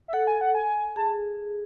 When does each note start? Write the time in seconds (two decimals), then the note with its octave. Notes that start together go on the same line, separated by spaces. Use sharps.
0.08 E5
0.13 A4 F#5
0.27 G#5
0.41 F#5
0.55 G#5
0.96 G#4 A5